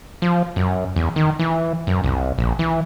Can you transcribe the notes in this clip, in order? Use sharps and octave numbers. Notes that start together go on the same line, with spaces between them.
F3
F#2
E2
D#3
E3
F#2
C2
A#1
E3